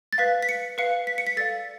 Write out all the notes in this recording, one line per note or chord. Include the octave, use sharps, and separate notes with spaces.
A6
B4 F5 B6
B6
C#7
B4 F5 C#7
B6
C#7
B6
A4 D5 F5 A6